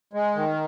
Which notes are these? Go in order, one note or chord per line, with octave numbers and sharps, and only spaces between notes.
G#3
D#3